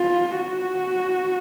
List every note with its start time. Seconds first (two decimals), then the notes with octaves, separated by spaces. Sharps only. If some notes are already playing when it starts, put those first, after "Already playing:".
Already playing: F4
0.37 F#4